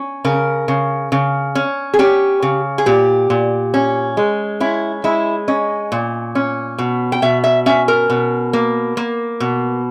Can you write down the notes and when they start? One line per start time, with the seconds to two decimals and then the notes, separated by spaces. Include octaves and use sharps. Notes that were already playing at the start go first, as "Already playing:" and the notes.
Already playing: C#4
0.25 C#3 A#4
0.68 C#3
1.12 C#3
1.55 C#4
1.94 G#4
1.99 C#4 G4
2.42 C#3
2.78 G#4
2.86 A#2 G4
3.30 A#2
3.74 C#4
4.17 G#3
4.60 C#4 E4
5.04 G#3 E4
5.48 C#4 D#5
5.92 A#2
6.35 C#4
6.78 B2
7.12 G5
7.22 B2 E5
7.44 E5
7.66 C#4 E5
7.88 A#4
8.10 B2
8.53 A#3
8.97 A#3
9.40 B2